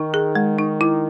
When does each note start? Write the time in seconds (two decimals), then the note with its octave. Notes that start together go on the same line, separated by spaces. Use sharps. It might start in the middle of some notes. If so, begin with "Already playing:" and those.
Already playing: D#3 D#4
0.14 G#4
0.35 G#3
0.59 D#4
0.81 E4